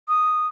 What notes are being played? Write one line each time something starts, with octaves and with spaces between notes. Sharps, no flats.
D#6